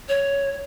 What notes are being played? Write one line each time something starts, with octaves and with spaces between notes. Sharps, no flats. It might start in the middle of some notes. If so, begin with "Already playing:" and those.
C#5